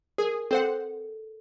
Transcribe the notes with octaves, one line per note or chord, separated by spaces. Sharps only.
G#4 A#4
C4 A4 C5 F#5